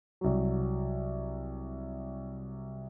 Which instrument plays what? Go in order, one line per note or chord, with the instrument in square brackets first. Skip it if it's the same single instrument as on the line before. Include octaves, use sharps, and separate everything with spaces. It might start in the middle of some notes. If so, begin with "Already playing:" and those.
[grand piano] C2 F#3